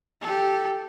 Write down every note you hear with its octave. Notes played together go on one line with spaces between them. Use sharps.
G4 A4